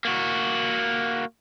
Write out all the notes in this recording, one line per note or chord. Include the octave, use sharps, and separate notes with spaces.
A#3 F#4